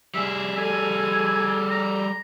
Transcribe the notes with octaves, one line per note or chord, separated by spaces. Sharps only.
G3 G#4 E5
A4 G#5
A#5